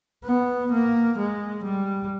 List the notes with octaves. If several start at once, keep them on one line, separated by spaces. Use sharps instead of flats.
B3
A#3
G#3
G3